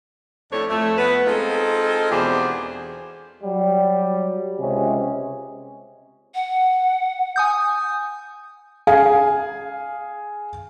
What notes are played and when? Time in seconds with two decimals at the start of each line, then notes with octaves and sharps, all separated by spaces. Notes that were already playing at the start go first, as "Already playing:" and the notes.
0.52 F2 A2 A3 D4 A4 C#5
0.70 F2 A3
0.98 B3 B4
1.27 G#3 C4 D#4 F4 A4
2.11 E2 B2 D4 G4 G#4 C5
3.43 F#3 G3
4.59 C#2 C3 G#3 C#4 G#4
6.35 F#5
7.36 G#5 D#6 G6
8.87 G#4 F5 G#5